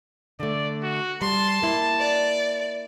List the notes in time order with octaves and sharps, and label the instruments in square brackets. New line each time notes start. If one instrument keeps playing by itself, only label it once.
[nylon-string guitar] D3 A3 [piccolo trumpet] D5
[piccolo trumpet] F#4
[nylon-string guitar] G3 [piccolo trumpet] A5 [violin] C6
[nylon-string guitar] A#3 E4
[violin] D5